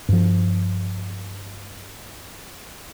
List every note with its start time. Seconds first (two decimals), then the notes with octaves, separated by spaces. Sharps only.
0.09 G2 F3